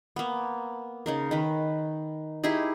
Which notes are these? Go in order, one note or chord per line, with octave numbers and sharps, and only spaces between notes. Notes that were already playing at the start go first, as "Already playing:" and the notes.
A#3 B3
C#3 D#4 A#4
D#3 B4
D#4 E4 G4 G#4